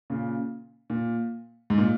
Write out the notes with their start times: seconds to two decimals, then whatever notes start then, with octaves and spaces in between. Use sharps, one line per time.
0.10 A#2 C#3
0.90 A#2
1.70 G#2
1.78 A#2